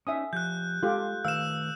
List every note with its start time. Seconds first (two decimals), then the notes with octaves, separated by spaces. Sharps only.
0.07 C#4 D#4 E5 G#5 D#6
0.33 F3 G4 F#6 G6
0.83 G#3 F4 G4 A4
1.25 D#3 A3 B4 F5 E6 E7